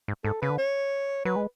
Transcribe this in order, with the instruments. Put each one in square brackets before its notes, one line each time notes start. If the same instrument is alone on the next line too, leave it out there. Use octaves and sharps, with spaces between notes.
[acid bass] G#2
[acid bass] G#2 [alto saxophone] A4
[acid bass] C#3 [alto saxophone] B4
[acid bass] D3
[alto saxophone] C#5
[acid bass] F#3 [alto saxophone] B4
[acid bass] G#3